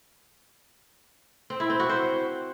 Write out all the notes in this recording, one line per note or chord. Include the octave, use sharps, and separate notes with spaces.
C4
E4
C4
F#4
C5